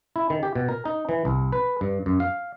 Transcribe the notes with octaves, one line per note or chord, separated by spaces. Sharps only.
E4
D#3
G4
B2
A#4
D#4
E3
C2
B4
G2
F#2
F5